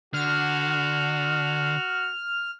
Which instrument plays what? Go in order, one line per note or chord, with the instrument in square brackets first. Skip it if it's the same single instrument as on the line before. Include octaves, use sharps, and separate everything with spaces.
[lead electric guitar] D3 [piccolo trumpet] F#4 [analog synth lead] F6